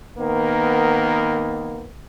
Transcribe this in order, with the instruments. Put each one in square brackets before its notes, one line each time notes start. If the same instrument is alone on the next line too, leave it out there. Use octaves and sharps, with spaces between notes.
[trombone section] D#3 A#3 B3